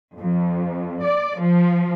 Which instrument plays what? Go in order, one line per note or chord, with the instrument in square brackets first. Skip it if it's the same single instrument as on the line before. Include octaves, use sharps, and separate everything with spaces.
[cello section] F2
D5
F3